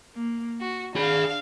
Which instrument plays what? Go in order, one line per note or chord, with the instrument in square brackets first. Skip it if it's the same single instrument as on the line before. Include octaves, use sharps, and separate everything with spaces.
[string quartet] A#3
F#4
[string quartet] D4 F5 [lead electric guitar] G#4 B5